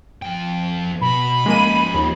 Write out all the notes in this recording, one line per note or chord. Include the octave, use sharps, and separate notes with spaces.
F2 G5
B2 B5
F3 G#3 A#3 C#4 D#7
D#2